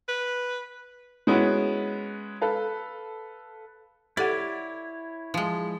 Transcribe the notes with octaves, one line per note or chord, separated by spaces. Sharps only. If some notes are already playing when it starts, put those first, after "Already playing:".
B4
G#3 B3 C#4 E4 F#4
A4 B4 F5
E4 G4 A4 C#5 D5 F#5
F3 G#3